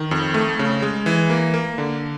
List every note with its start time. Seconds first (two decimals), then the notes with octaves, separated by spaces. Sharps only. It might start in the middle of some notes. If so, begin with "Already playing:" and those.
Already playing: D#3
0.11 F2
0.34 A3
0.59 C#3
0.82 G#3
1.06 E3
1.30 A#3
1.54 A#3
1.78 D3